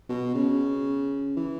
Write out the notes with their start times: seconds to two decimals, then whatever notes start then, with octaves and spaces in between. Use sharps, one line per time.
0.09 B2
0.35 C#3
1.36 E3